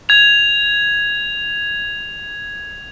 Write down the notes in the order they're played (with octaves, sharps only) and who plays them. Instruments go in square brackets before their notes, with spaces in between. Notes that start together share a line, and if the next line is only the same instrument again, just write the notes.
[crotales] G#6 F7